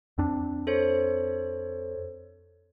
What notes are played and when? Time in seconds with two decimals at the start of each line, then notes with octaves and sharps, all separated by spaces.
0.18 F2 C4 D4
0.67 A4 C5 C#5